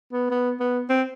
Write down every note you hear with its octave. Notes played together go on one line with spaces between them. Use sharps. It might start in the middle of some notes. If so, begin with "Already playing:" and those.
B3
B3
B3
C4